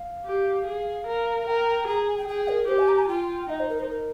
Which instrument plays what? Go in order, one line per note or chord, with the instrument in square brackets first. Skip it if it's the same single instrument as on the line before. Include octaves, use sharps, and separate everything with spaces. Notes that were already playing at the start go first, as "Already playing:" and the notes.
Already playing: [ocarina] F5
[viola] G4
G#4
A#4
[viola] A#4 [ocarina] G5
[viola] G#4 [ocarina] A#5
[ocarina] G#5
G5
[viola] G#4 [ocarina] G5
[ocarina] A#4
[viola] G4 [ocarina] C5
[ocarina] G#5
A#5
G#5
[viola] F4 [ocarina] G5
[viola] D#4 [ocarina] D#5
[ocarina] C5
A#4
C5
A#4